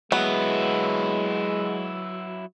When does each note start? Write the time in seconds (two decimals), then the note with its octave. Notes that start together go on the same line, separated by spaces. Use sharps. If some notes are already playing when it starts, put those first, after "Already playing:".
0.12 F#3 G#3 B3 E4